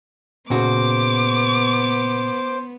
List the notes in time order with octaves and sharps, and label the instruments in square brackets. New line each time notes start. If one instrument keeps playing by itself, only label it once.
[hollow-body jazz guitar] A#2 C#3 F#4 [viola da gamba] B3 [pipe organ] C5 [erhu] D6